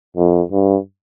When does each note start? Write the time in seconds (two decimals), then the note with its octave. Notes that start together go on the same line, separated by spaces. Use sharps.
0.17 F2
0.52 G2